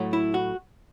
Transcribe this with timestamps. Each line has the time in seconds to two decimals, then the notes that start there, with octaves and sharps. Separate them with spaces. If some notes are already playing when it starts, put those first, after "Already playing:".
Already playing: A2 F#3 A3
0.13 E4
0.34 F#4